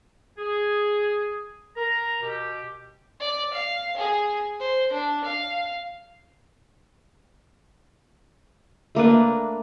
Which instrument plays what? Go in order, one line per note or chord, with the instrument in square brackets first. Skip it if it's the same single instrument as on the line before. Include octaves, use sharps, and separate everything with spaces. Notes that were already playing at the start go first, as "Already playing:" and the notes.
[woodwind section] G#4
A#4 A#5
B2 G4
[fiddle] D5
F5
G#4
C5
D4
F5
[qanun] A3 A#3 D4 B4